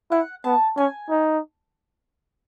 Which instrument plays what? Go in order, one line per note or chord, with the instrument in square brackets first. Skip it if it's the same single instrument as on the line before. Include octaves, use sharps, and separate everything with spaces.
[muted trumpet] E4 [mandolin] F#5
[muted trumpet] B3 [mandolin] A5
[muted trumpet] C#4 [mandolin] G#5
[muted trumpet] D#4